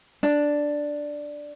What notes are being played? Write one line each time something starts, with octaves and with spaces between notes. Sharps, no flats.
D4